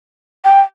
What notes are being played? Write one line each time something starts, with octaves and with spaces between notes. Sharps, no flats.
G5